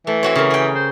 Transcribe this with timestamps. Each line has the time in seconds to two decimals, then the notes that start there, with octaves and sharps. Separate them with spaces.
0.07 E3 A3
0.23 C4 F#4 C#5
0.35 C#3 A#4
0.50 G#4 G5
0.75 C5